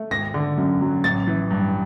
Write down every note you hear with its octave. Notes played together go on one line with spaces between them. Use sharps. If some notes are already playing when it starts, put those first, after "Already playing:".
Already playing: A3
G#1 A#6
D3
F#2
F#3
A1 A6
E3
G2